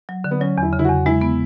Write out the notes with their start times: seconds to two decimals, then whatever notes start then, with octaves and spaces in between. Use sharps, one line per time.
0.09 F#3
0.24 D3
0.31 B3
0.41 F#3 C#4
0.58 E2 E4
0.73 C#3
0.79 E4
0.84 F#4
0.89 E2
1.06 G#3 E4
1.21 B3